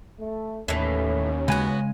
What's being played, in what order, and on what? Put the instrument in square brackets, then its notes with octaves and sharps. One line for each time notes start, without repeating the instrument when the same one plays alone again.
[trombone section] A3
[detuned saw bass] D#2 [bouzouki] A2 E3 [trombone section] C#4
[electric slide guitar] C#3 G#3 G#5 [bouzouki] B3 F#4